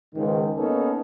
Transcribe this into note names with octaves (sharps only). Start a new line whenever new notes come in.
C#2 G#2 D#3
A#3 B3 C#4 D#4 A4 A#4